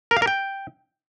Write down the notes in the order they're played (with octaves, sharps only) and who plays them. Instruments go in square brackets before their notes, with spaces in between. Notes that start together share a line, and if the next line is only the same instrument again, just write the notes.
[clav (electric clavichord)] A#4
F5
A#4
G5